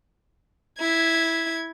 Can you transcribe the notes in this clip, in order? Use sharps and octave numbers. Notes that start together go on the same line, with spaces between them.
E4 G#6